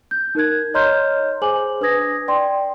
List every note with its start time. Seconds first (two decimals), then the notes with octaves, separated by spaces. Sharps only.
0.11 G6
0.35 D#4 A#4 F#6 G#6
0.74 C#5 D#5 A#5 C6 F6 G6
1.42 G#4 C5 G#5 D6 F#7
1.81 D4 B4 G#5 D#6 G#6 A#6
2.28 D5 G5 C6